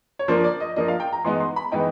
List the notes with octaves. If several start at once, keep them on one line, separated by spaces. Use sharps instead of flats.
C#5
F3 A#3 D4 C5
D5
D#5
F3 A#3 D4 D#5
F5
G5
A#5
E3 G#3 B3 D#4 C6
C6
B5
E3 G#3 B3 D#4 G5